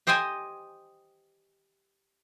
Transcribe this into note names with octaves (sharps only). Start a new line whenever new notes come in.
G4 C5 D#5 G5 G#5